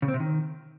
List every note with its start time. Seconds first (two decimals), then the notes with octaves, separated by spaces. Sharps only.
0.02 C#3
0.08 C4
0.14 C3
0.20 D#3